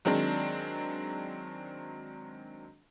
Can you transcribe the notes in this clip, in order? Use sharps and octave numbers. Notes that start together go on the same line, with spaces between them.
D#3 F#3 G#3 C4 D4